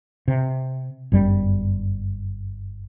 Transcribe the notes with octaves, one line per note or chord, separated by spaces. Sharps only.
C3
G1 F#2 G3